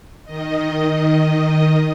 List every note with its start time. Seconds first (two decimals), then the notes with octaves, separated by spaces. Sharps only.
0.25 D#3 D#5